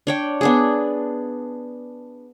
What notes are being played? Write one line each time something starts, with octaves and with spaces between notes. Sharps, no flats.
D4 C#5 G5
B3 D4 G#4